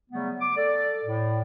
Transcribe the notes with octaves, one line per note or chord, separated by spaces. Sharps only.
C#3 F#3 G3 A3 B3
D6
A4 D5
A2